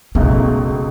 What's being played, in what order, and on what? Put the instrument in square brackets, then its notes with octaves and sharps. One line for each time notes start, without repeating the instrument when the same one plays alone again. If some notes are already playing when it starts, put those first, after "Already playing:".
[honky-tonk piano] C#2 B2 A3 D#4 [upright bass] B3